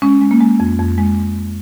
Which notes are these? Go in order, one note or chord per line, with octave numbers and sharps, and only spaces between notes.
G#3 C#4
G#3
A#3
G#3
F2
F2
G#3